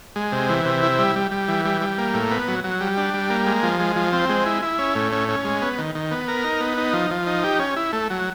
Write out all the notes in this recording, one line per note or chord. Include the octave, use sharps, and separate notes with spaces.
G#3
C3
E3
C3
E4
G3
G3
G3
E3
G3
G3
A#3
A2
B3
F#3
F#3
G3
D4
G3
A#3
G#3
F3
G#3
F3
C4
G#3
E4
E4
C#4
A2
C#4
C#4
G#3
B3
D#3
D#3
B3
A#4
D#4
B3
D#4
F3
F3
D#4
G4
C#4
E4
A3
F#3